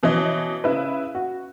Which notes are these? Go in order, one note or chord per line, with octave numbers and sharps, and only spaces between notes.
B2 E3 C#4 C#5 D#5
C#3 E4 B4
F#4